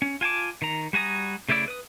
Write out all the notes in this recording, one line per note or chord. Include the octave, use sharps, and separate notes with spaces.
C#4
F4 G#5 A5 D6
D#3 A#5
G3 F#4 G#5 A#5 D#6
C#3 A3 E4 D5 E6
B4 D#6